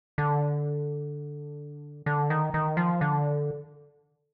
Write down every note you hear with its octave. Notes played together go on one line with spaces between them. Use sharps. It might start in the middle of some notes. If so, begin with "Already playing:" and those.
D3
D3
D#3
D#3
F3
D3